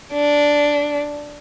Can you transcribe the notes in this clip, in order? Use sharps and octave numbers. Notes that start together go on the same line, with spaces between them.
D4